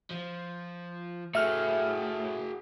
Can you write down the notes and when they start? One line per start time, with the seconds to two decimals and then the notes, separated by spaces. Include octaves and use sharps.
0.11 F3
1.35 A2 A3 F#4 G#4 E5 F6